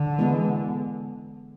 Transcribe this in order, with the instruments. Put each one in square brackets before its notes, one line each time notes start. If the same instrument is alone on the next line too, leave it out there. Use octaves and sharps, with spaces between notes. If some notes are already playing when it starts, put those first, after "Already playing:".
Already playing: [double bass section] D3
[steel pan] E3 G#3 B3